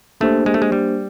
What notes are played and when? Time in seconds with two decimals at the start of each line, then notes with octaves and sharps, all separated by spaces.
0.20 A3 A#3 D4 G4 C5
0.46 G#3
0.54 A3
0.62 G#3
0.72 G3